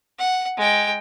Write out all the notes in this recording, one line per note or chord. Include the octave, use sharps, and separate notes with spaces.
F#5
G#3 G5